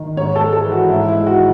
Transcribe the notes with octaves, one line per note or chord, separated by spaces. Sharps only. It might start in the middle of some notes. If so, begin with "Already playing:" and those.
Already playing: D#3
G#2 C#5
A4
G#3
A4
E3
F#4
G#2 E4
G#3 E4
F#4
D#3